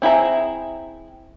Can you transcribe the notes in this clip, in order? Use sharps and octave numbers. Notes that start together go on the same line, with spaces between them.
C4 E4 G#4 A#5